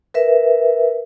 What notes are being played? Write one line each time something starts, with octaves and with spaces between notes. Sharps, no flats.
A#4 B4 E5